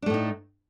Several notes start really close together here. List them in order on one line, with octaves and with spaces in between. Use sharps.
D4 A3 A2 D#4